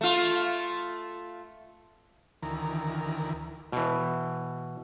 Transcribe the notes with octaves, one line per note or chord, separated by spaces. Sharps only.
A3 F4
D2 D#3 E3 A#4
B2 E3